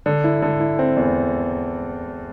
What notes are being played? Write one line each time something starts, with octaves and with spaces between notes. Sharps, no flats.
D3
E4
D3
E4
C4
E2